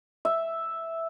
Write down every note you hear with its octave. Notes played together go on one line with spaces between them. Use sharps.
E5